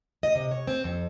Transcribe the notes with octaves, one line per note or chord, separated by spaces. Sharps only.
D#5
C3
C#5
C4
F2